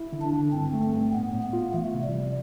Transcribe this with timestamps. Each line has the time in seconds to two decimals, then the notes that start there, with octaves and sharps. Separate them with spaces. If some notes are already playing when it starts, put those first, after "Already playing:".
Already playing: E4
0.13 D3
0.22 D4
0.33 D3
0.53 G2 C4
0.73 A3
0.83 C4
0.93 G2
1.13 A2 B3
1.33 A2
1.43 B3
1.53 F4
1.74 E3 A3
1.94 C3
2.04 G3
2.14 C3